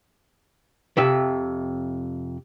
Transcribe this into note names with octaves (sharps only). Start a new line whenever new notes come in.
F2 C3 E5